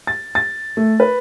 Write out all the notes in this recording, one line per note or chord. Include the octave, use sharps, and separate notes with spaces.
A6
A6
A3
B4